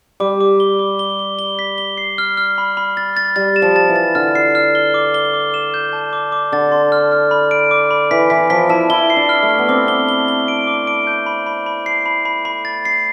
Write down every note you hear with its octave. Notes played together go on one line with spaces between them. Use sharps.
G3 D6
D6
G7
D6
G7
G7
G7
B6
G7
C7
F6
F6
B5
B5
A6
A6
G3 A6
E7
F3
A6
E3
A6
D3 F6
C7
F6
G7
D6
G7
D6
E7
G6
A5
D6
D6
D3 A6
C6
F6
F6
B5
D7
D6
B5
E3 B6
E3 B6
F3 B6
E4 A5
E4 G7
C7
D4
F6
A3
F6
B3
C4 D6
G7
G7
G7
D7
D6
D7
G6
B5
B5
B5
C7
B5
B5
B5
A6
C7